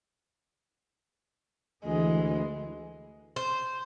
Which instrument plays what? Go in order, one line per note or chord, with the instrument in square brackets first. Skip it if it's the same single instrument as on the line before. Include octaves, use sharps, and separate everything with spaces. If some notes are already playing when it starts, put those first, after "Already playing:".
[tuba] D2 [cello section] E3 [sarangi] G#3
[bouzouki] C5